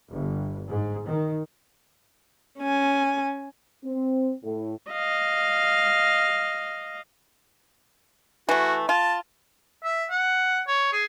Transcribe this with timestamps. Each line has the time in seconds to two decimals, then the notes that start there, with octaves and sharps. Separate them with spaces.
0.10 G1
0.68 G#2
1.08 D#3
2.59 C#4 G#5
3.84 C4
4.44 A2
4.91 D#5 F5
8.49 E3 A3 F#4
8.89 F4 A5
9.84 E5
10.10 F#5
10.67 C#5
10.92 G#4